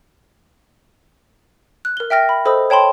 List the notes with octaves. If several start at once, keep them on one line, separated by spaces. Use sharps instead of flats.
F#6
A#4 G7
E5 G5 F6 A#6
B5
A4 C5 D#5 B5 D#6 E6
C#5 G5 A5 B5 C6